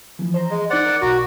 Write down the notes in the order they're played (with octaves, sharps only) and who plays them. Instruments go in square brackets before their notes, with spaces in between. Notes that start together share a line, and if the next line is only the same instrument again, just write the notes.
[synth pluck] E3 F3
C5 A#5
[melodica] G#3
[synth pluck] D#4 C5 [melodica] D5 F#5
[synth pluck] A#4
[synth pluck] B1 A#5 D6 [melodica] F#4